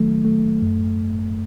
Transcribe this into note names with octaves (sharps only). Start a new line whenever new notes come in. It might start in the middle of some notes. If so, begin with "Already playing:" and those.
Already playing: D#3 F#3 A3
A3
F#2